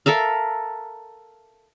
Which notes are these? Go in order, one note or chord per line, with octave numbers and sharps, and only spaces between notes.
A4 A#4 E5 F5